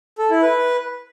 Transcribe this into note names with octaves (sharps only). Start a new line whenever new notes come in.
A4
E4
B4